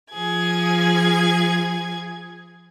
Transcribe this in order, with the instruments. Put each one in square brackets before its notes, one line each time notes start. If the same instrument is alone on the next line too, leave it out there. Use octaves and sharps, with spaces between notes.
[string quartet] F3 G#4 G#6